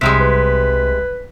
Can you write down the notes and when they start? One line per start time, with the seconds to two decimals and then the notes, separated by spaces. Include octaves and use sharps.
0.01 C2 C3 G3 G#3 B6
0.20 B4